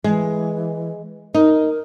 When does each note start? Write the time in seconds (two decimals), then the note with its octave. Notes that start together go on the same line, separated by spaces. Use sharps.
0.04 E3 G#3
1.34 D#4 A#4